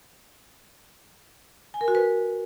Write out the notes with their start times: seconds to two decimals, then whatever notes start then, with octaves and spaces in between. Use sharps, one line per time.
1.74 G#5
1.81 A#4
1.88 F#4
1.95 B4